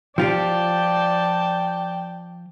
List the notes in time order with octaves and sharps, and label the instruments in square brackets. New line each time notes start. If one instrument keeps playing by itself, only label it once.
[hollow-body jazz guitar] F3 F4 G4 [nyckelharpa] D5 A5 [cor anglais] G5